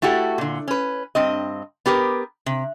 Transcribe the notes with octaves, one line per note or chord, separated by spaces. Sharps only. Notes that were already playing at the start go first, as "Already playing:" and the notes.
A3 E4 F#4 G4 A4
A#2 D3
C#4 B4
G2 C4 D#5
B3 G4 A#4 B4
C3